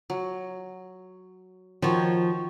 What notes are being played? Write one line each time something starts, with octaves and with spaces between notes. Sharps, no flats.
F#3
D#3 F3 F#4 C#5